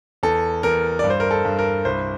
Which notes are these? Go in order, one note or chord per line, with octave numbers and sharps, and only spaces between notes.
E2 A4
E2 A#4
G2 D5
C5
A#4
A4
G2
A#4
C2 C5